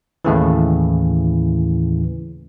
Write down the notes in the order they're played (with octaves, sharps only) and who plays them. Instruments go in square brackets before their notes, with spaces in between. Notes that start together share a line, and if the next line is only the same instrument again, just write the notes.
[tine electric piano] D#2 A2 C#3 E3